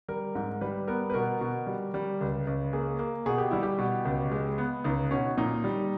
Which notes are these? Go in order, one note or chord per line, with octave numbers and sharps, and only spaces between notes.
G3 A#4
G#2
G3 B4
B3 A#4
B4
B2 A#4
B2
G3
G3
C#2
C#2
A#3 G#4
A#3
B2 G#4
G4
G3 E4
G4
B2
C#2
G#3
B3
C#2 D#4
B2 C#4
A#2 D#4
G3